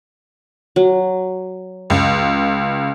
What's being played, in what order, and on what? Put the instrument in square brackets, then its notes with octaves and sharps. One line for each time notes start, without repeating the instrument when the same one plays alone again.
[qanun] F#3
[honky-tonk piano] C#2